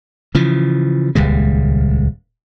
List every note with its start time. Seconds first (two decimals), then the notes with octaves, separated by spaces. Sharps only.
0.35 C#3 E3 F3
1.15 D#1 C#2 G3 G#3